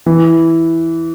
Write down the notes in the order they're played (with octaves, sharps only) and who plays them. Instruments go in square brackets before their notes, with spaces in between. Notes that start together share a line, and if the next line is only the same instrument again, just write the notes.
[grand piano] E3